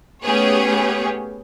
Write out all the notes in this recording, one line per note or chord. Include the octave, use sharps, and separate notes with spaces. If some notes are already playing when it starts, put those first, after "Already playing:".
A3 B3 C#4 G4 G#4 C#5